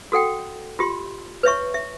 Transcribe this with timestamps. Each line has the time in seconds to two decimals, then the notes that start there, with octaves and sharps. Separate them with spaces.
0.12 F#4 A4 F#5 G5
0.79 F4 G4 C6
1.43 B4 C#5 E5 C#6
1.74 E5